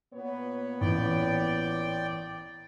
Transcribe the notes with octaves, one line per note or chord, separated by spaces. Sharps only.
A#2 B3 C#5
A1 D5 G5